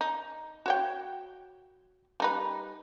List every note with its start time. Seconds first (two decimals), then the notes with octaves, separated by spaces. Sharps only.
0.01 D#4
0.66 F#4 C#5 G5
2.20 G3 D#4 B4